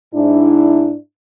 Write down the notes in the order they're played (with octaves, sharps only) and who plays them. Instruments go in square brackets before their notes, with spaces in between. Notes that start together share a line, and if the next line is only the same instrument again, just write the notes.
[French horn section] G#2 D4 E4